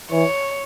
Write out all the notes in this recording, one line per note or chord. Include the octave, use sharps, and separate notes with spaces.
E3 C#5